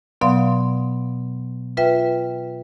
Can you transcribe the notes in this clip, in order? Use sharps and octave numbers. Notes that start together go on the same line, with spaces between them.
B2 F#3 B3 D5 F5 C6
F4 B4 E5 G5